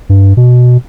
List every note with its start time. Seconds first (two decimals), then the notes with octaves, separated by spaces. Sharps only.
0.09 G2
0.37 B2